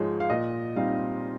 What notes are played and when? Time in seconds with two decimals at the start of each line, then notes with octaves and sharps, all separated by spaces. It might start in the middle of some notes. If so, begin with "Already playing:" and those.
Already playing: G#2 F3 G#3 C#5
0.20 F5
0.30 A#2 D#5
0.76 G3 C4 D#4 F5